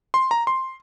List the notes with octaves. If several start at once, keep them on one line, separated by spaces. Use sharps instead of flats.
C6
A#5
C6